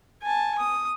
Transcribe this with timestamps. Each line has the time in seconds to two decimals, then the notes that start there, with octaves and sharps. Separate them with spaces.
0.22 G#5 A5
0.58 D#6